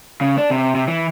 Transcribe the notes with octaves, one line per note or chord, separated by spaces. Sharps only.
C#3
D4
C3
C3
E3